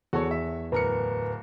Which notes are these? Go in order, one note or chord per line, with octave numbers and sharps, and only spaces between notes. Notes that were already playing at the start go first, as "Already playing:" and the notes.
E2 F#4 A4 C#5
E5
D1 A#4 B4 C#7